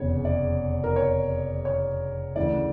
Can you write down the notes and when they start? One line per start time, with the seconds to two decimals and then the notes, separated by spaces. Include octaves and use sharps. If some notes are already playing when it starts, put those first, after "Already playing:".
Already playing: F1 E2 C#3 C#5
0.25 D5
0.84 A#4
0.96 C#5
1.65 C#5
2.36 D2 C#3 E3 D5